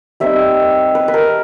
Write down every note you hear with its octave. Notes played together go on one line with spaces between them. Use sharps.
G3 C4 D#4 E5
B4
B4
A#4